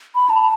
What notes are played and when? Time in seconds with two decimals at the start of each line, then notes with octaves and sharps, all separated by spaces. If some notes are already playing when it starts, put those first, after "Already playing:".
0.15 B5
0.30 A5